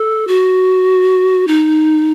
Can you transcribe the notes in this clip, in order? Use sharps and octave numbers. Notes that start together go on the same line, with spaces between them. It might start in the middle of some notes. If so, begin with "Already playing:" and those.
Already playing: A4
F#4
D#4